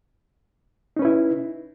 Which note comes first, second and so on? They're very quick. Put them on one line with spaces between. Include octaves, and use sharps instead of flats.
D#4 C#4 B4 E4